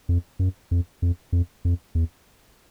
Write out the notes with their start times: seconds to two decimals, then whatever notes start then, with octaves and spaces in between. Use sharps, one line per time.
0.09 F2
0.39 F#2
0.71 F2
1.02 F2
1.33 F2
1.65 F2
1.95 E2